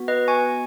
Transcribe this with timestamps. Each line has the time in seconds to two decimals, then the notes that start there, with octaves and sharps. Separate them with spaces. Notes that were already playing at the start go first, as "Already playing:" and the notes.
Already playing: B3 F#4
0.08 B4 D#5
0.28 G#5 C#6